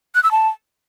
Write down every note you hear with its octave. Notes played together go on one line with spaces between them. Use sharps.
F#6
E6
A5